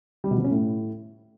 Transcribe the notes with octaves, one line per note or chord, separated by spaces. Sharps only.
G3
B2
F3
C#4
A2